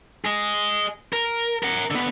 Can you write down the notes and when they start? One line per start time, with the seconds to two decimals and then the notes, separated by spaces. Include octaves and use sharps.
0.25 G#4 D#5
1.13 A#4
1.63 A#4 F#5
1.91 D3 B3